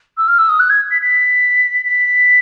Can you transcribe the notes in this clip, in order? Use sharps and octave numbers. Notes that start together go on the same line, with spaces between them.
E6
F6
E6
D#6
F#6
G#6
B6
B6
B6